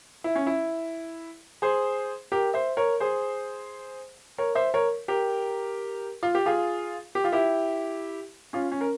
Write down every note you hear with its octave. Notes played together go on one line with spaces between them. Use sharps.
E4
C#4
E4
G#4 C5
G4 A#4
C5 E5
A#4 C#5
G#4 C5
A#4 C#5
C5 E5
A#4 C#5
G4 A#4
F4
G4
F4 G#4
G4
F4
E4 G4
C#4 F4
C#4
A#4